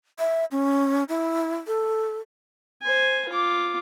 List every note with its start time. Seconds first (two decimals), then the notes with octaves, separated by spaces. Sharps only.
0.19 E5
0.51 C#4
1.09 E4
1.67 A4
2.82 C5 G#5
3.29 F4 D6